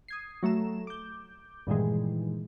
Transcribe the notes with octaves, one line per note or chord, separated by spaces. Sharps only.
D#6 G#6 C7
F#3 A3 A#5 E7
D6 G6
G2 A#2 D#3 E3 G#3